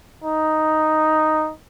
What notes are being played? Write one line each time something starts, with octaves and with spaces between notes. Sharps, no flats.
D#4